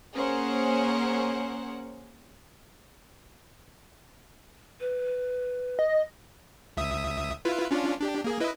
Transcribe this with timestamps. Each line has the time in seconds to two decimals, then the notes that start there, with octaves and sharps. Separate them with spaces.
0.15 A#3 C#4 G#4 A#4 C5 F#5
4.80 B4
5.79 D#5
6.77 C#2 E5 D#6
7.45 E4 F4 B4
7.71 C#4 D4 F4
8.01 D4 G4
8.24 A#3 G#4
8.40 E4 B4 D#5